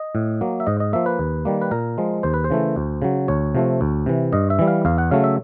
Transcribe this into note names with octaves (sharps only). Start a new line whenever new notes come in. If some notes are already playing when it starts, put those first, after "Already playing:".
Already playing: D#5
A2
F#3 A#3
E5
G#2 D#5
D#5
F3 A#3 E5
B4
D#2
D#3 G3 A#3
B4
A#2 A#4
F3 G#3
D#2 C5
B4
C5
C#3 E3 A3
D2
C#3 F#3
D2 C#5
C3 F3 A3
D2
C3 E3
G2 D#5
E5
E3 G3
F5
E2 F5
F#5
C#3 F#3 A3 F5
E5